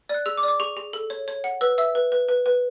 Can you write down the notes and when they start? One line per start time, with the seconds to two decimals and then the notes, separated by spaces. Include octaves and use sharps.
0.09 D5 F#6
0.26 G#4 E6
0.37 D6
0.43 D5
0.48 D6
0.60 G#4 C#6
0.77 G#4
0.93 A4
1.10 C#5
1.28 C#5
1.44 F#5
1.61 B4 E6
1.78 E5 E6
1.95 B4
2.12 B4
2.29 B4
2.46 B4